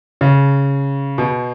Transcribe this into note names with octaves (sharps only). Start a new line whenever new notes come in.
C#3
B2